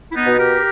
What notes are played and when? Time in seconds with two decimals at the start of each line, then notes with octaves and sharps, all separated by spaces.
0.11 E4
0.15 B3 D#4
0.27 B2
0.38 G4 A#4